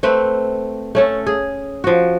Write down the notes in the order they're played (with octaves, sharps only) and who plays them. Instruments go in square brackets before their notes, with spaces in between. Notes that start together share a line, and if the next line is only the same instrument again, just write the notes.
[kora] A3 C4 B4
A3 C#4 A4
G#4
F3 F#4